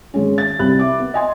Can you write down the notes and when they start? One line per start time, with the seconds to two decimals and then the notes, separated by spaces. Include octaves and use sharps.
0.14 G#1 G#3 C#4
0.38 A6
0.59 C2 G3 C4 B5 F#6
0.79 E5 D6
0.99 B3
1.14 D#5 G#5 C6